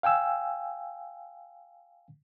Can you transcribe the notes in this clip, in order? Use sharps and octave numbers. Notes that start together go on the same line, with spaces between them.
F5 G5 G#5 E6